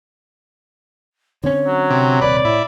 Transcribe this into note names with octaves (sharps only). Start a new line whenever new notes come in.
D3 C4 C#4 C#5
F#3
C3
D#1 C3 B4 D5
A2 E4